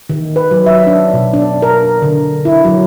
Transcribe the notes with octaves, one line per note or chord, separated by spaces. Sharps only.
D#3
B4
F#3
E5
D4
B2
D4
A#4
D3
E4
F#3